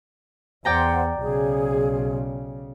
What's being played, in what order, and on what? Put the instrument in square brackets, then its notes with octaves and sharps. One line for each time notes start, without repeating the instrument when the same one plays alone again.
[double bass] E2 [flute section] C5 F#5 [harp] D5 G5 A#5
[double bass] B1 C#3 [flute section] G#4